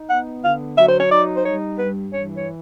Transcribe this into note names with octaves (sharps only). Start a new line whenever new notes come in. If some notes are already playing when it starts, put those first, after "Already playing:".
Already playing: D#4
B3 F#5
D3 F5
F#3 E5
C5
C#5
D#4 D5
C5
G3 C#5
G2 B4
E3 C#5
C#5